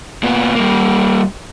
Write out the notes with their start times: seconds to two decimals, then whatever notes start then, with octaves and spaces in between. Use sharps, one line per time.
0.23 A#2 B3
0.55 G3 A#3